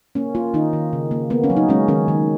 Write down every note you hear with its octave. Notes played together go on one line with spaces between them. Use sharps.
A#3 C#4
A#3 F4
D#3 D#4
D#3
C#3
A#3
A#3 B3
C#4
F#3
D#4
G#3 C#4
D#3 C#4
D#3